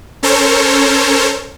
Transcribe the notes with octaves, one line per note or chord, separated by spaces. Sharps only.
C#4 A4 A#4 C5 C#5